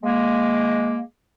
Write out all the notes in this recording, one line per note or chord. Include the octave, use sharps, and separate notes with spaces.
G#3 A#3